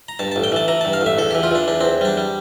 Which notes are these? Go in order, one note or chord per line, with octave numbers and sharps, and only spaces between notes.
A#5
G2 A5
A1 A5
G5
E3 A5
E3 A#5
G2 A5
F5
A1 E5
E2 A4
E3 G4
F4
E3 D4
E2 D4
E2 C4
G3 D4
G3